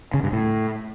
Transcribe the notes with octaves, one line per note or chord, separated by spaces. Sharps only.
C#3
G2
A2